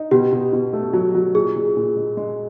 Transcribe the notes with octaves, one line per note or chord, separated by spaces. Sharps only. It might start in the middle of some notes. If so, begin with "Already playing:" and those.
Already playing: D#4
B2 G4
B2
B2
A3
F#3
F#3
A#2 G#4
A#2
A#2
G#3
G#3